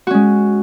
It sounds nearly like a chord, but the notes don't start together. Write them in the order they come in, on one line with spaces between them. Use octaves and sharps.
F#4 C#4 G#3